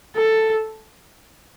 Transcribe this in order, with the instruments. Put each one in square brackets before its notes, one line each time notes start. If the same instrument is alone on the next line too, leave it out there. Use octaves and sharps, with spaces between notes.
[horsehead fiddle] A4